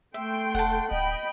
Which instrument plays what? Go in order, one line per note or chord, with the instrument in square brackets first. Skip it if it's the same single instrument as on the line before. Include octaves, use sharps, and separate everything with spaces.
[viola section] A3 G5 C6 [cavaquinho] E5
[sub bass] E1 [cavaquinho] F#5 A5
[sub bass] D1 [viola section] D#5 G5 B5